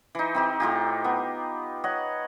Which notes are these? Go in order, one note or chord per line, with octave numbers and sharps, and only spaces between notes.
E3 D#4
C4 D#4 G4
A2 F4 G4
B3
C#5 D#5 F#5